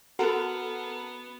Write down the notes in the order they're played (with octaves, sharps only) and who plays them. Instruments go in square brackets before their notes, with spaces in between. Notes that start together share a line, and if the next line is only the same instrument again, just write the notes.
[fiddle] B3 [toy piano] F#4 [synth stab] A4 F#5 [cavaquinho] A#4